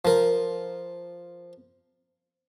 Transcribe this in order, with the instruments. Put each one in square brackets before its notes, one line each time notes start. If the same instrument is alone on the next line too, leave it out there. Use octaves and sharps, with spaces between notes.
[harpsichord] F3 A#4